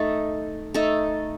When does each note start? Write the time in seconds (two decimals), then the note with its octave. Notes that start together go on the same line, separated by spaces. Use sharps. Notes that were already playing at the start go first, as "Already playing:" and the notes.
Already playing: A3 D#4 A4
0.74 A3 D#4 A4